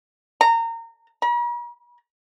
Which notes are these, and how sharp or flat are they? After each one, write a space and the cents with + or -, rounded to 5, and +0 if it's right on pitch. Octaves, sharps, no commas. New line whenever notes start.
A#5 -25
A#5 +45